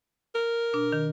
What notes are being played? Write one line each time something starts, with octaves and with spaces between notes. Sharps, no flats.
A#4
B2 D4
D#3